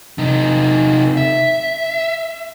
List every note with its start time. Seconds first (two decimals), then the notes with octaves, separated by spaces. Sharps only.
0.18 C3 D#4
1.17 E5